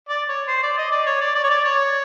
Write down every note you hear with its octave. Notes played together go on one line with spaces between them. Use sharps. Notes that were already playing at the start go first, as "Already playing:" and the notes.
D5
C#5
C5
D5
D#5
D5
C#5
D5
D5
C#5
D5
C#5